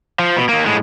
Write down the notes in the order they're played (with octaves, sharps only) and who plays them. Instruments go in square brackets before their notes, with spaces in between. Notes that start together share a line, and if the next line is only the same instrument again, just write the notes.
[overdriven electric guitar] F3
B2
D#3 A#3
A2 G#3